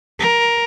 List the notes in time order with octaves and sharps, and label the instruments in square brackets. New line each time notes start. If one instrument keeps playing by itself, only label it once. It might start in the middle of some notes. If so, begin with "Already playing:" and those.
[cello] A#4